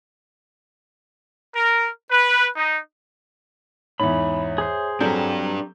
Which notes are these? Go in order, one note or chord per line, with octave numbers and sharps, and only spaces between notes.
A#4
B4
D#4
E2 G#2 C#5 E5 B5
G#4 C5
F#3 C4 D4 G4 A4 A#5 G6